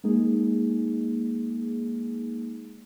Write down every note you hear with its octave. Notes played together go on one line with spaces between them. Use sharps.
G#3 A#3 D#4 G#4